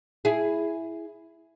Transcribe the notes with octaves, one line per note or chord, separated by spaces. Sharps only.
E4 G#4